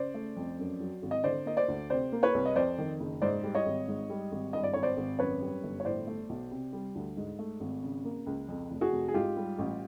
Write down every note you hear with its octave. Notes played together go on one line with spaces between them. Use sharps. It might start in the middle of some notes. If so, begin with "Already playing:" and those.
Already playing: C#3 C5 D5
A3
F2
F#2
F#3
G#1
D#5
D3 C5 D5
A#3 D#5
C5 D5
D2
C3 C5 D5
A#3
B4 C#5
C2
D#5
F2 C5 D5
D#3
F#1
G#2 C5 D5
G3
C#5 D#5
G#1
G#2
G3
G#1
G2 D#5
D5
G#1 C#5
C5 D5
G#1
F#2 B4 C#5
G3
G1
C#5
A2 C5 D5
A3
B1
C3
G3
D2
G#2
A3
G#1
C#3
A#3
C#2
F2
F1
F#4 G#4
F1
G#4
G#2 F4 G4
G3
A1